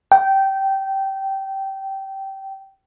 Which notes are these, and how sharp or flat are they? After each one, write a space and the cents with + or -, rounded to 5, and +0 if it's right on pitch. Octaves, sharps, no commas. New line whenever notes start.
G5 -15